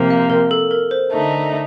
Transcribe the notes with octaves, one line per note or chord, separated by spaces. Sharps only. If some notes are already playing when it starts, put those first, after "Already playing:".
Already playing: C3 F3 A#3
F5
A#4
A4
A#4
C5
D3 A3 D#4